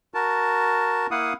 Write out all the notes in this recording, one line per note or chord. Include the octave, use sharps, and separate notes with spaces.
F#4 A#4 A5
A#3 E4 F5 F#5 D#6